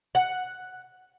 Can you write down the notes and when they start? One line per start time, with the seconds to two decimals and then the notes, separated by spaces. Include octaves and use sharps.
0.15 F#5